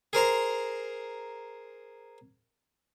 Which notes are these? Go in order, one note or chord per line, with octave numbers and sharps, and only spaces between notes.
G#4 A#4 C5 A#5